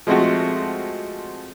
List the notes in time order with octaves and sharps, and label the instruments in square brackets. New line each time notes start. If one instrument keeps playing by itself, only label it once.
[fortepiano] F3 G#3 A3 C4 F#4